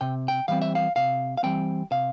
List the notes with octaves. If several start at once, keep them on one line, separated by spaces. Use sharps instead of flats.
C3 G5
G5
E3 G3 C4 F5
E5
F5
C3 F5
F5
E3 G3 C4 G5
C3 F5